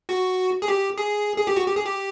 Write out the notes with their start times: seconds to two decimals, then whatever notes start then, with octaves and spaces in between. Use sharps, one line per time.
0.09 F#4
0.62 G#4
0.68 G4
0.98 G#4
1.37 G#4
1.47 G4
1.56 F#4
1.67 G4
1.76 G#4
1.86 G4